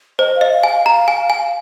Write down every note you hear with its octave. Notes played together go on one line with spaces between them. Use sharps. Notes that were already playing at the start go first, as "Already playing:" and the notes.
C5 D#5
F5
D#5
F5
G#5
F5
A#5
G#5
G#5